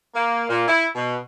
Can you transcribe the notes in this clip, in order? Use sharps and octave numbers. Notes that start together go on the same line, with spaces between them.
A#3
A#2
E4
B2